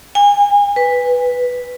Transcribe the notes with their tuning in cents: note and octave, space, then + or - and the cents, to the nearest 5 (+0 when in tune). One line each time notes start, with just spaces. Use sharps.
G#5 -35
B4 +0